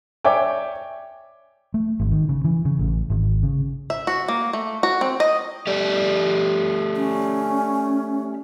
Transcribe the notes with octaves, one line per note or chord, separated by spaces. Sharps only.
C#5 D5 E5 G5 G#5 D6
A3
G#1
D#3
C#3
E3
C#3
A1
G#1
C#3
E5
F#4
A#3
A3
F#4
C4
D#5
A3 G4 D5
C#4